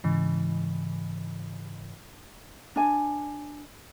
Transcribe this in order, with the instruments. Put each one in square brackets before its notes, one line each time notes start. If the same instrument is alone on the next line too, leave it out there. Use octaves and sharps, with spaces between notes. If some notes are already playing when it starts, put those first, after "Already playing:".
[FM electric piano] G#2 C#3 E3
[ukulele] D4 G#5